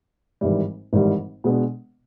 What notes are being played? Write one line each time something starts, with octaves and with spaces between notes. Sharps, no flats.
G#1 G#2 E3 G3
G#1 G#2 E3 G3
B2 G#3 B3 D4